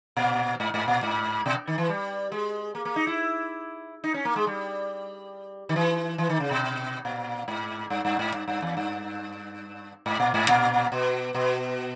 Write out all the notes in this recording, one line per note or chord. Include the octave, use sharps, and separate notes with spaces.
A#2
G#2
G#2
A#2
G#2
B2
D#3
E3
G3
G#3
A#3
A#3
D#4
E4
D#4
C#4
A#3
G#3
G3
D#3
E3
E3
D#3
C#3
B2
A#2
G#2
G2
G2
G#2
G2
G2
E2
G2
G#2
A#2
G#2
A#2
B2
B2